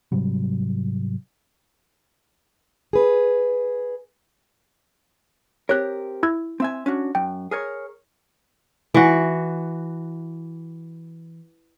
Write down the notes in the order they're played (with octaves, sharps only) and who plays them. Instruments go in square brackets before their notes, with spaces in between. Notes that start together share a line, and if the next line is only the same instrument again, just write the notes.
[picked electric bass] G#2 C3 F#3 G3
[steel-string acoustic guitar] G#4 B4
[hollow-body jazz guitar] C4 G4 A#4 [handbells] C#5 F#6
[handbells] E4 E6 G#6
[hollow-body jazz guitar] C4 E5 G#5
C#4 D4 F#4
[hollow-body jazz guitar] F#2 [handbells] G5
[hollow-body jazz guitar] G#4 A#4 C#5
[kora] E3 F#4